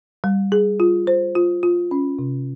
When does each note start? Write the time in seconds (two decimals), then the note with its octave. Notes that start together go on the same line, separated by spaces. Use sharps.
0.24 G3
0.52 G#4
0.80 F4
1.07 C5
1.35 F4
1.63 F4
1.91 C#4
2.19 C3